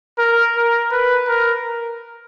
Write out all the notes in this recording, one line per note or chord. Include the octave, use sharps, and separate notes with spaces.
A#4
A#4
B4
A#4